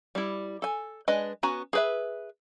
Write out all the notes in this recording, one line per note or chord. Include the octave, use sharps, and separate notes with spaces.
G3 E4
A4 G#5
G#3 D4 B4 D#5 G#5
B3 C#4 F#4 G#5 A#5
G#4 B4 E5